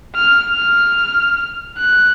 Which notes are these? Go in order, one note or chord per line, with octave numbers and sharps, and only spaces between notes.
F6
F6
F#6